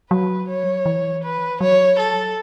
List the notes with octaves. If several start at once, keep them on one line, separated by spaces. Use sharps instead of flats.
F#3 B4
C#5
E3
B4
F#3 C#5
A4